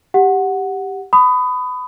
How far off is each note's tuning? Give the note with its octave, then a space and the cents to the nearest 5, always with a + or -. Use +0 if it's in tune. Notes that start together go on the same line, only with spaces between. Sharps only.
G4 +0 F#5 +0
B5 +25 D#6 -10